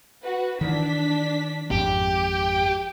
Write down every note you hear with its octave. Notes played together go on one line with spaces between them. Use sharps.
F#4 B4
D#3 E3 D4 B6
G#1 F2 G#2 G4
G5